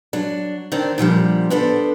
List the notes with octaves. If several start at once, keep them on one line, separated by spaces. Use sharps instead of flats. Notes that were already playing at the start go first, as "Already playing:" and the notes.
F#3 D4
D#3 C4 D4
A#2 D3 F3 G3
B3 D4 A4 C5